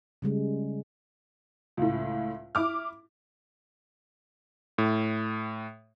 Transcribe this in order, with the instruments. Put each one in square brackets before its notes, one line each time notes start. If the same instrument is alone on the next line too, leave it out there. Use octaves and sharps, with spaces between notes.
[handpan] C#3 G3 G#3
[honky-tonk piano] C#2 A2
E4 D6 F6
[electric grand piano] A2